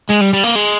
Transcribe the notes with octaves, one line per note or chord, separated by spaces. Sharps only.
G#3
G3
G3
A#3
G#3